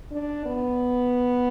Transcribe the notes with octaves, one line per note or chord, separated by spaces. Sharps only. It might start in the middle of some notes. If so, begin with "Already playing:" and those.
D4
B3